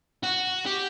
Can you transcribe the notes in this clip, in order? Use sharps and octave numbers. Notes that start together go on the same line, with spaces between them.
F#4
G4